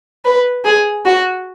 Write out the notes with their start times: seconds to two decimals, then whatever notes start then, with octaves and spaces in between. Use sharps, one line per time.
0.25 B4
0.65 G#4
1.05 F#4